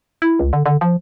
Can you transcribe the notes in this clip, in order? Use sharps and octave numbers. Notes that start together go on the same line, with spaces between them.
E4
C#2
D3
D3
F3